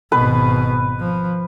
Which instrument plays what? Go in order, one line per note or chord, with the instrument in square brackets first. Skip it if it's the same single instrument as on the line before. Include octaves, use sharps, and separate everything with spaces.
[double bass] G#1 B2 [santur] B4
[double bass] F3